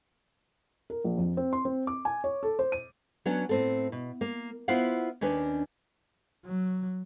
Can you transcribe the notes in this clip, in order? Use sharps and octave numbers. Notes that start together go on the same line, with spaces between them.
A#4
A#1
F2
C4
C6
C4
D6
G#5
C#5
A4
C5
D#7
F#3 B3 C#4 D4
A2 C4 A4
B2
A#3
B3 E4 F4 C5 F5 F#5
D#2 C#4 D4 B4
F#3